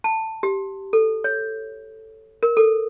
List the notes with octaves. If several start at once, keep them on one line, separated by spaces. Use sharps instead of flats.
A5
G4
A4
C#5
A#4
A4